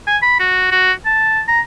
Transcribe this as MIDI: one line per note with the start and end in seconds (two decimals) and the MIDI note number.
0.07 0.17 80
0.22 0.39 83
0.40 0.69 66
0.72 0.92 66
1.06 1.42 81
1.48 1.61 82